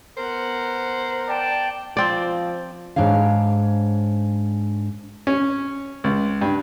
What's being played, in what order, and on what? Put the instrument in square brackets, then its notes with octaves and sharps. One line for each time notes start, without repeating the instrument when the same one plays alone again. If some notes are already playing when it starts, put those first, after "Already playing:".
[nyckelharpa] B3 F#5 [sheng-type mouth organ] A#4 [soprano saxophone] C5
[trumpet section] D5 G5 A5
[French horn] F3 [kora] C4 D5
[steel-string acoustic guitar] G#2 D4 C#5 F5
[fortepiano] C#4
C#2
G2